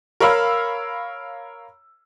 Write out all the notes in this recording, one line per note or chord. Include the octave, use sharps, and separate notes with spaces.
A#4 C#5 F5 B5 E6 F6